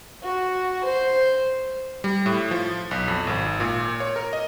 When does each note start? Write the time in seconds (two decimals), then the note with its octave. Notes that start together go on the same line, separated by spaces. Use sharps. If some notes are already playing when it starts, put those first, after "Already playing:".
0.23 F#4
0.83 C5
2.04 G3
2.26 A2
2.51 F3
2.91 B1
3.08 F2
3.27 G#1
3.60 A#2
4.00 C#5
4.16 A#4
4.33 D#5